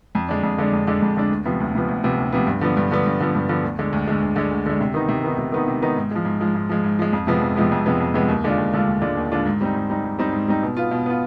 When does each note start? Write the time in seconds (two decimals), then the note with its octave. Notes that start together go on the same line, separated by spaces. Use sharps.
0.15 F2
0.29 D3 G#3 D4
0.43 F2
0.58 D3 G#3 D4
0.73 F2
0.87 D3 G#3 D4
1.02 F2
1.17 D3 G#3 D4
1.30 D2
1.46 C3 F3 B3
1.60 D2
1.75 C3 F3 B3
1.88 D2
2.03 C3 F3 B3
2.17 D2
2.33 C3 F3 B3
2.47 G2
2.61 D3 F3 B3
2.77 G2
2.91 D3 F3 B3
3.06 G2
3.20 D3 F3 B3
3.35 G2
3.49 D3 F3 B3
3.63 D2
3.79 D3 G#3
3.93 D2
4.07 D3 G#3
4.22 D2
4.36 D3 G#3
4.51 D2
4.66 D3 G#3
4.81 C3
4.94 D#3 B3 D#4
5.08 C3
5.24 D#3 B3 D#4
5.38 C3
5.52 D#3 B3 D#4
5.68 C3
5.82 D#3 B3 D#4
5.97 G#2
6.11 F3 G#3
6.25 G#2
6.41 F3 G#3
6.55 G#2
6.69 F3 G#3
6.84 G#2
6.99 F3 G#3
7.13 F2
7.27 C3 F3 G#3 B3
7.41 F2
7.56 C3 F3 G#3 B3
7.72 F2
7.86 C3 F3 G#3 B3
8.00 F2
8.14 C3 F3 G#3 B3
8.29 D#2
8.44 D3 G#3 D4 F4
8.58 D#2
8.73 D3 G#3 D4 F4
8.87 D#2
9.01 D3 G#3 D4 F4
9.17 D#2
9.32 D3 G#3 D4 F4
9.46 G#2
9.61 G3 C4 D#4
9.75 G#2
9.90 G3 C4 D#4
10.04 G#2
10.19 G3 C4 D#4
10.32 G#2
10.48 G3 C4 D#4
10.63 B2
10.77 B3 F4
10.91 B2
11.06 B3 F4